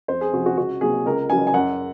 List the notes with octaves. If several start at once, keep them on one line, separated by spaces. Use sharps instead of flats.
F2 C5
G#4
C3 F3 F#4
F#4
C#2 F#4
C3 F#3 A#3 G#4
C#2 A#4
C#3 F#3 G#5
G#5
F#2 F#5